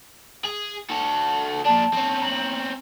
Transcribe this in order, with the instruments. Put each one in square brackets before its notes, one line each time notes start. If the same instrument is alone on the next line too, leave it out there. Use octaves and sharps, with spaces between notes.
[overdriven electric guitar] G#4
F#4 A4
[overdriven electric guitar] A#2 D4 [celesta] A5
[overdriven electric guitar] C4 C#4
[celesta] A#5 F#7